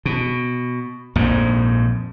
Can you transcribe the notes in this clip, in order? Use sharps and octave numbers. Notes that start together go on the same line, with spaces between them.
B2
A#1 F2 G#2